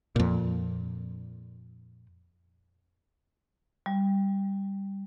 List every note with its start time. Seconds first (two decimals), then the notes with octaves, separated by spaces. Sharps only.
0.16 F2 A#2
3.86 G3